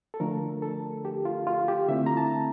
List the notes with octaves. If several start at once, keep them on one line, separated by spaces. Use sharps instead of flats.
A4
D3 F3 A3 D4 A#4
A4
G4
F4
F4
G4
D3 A3 C4 E4 E5
A#5
A5